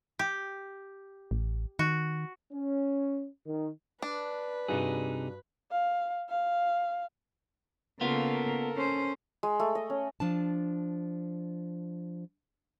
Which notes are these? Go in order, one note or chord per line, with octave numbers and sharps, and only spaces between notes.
G4
A1
D#3 F#4
C#4
D#3
D4 B4
G2 C3 D#4 F#4 G#4 F#6
F5
F5
C#3 A#3 B3 F4 A4 A#4
C#4 C5
G#3
A3
D#5
C#4
F3 D4 A5